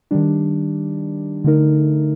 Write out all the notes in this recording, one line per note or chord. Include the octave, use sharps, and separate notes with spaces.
D#3 G3 D4
D3 A3 D#4 A#4